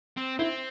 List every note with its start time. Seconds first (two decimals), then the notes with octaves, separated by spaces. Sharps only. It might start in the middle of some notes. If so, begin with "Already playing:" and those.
0.17 C4
0.39 C4 E4